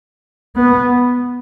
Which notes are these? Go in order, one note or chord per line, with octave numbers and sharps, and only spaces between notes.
B3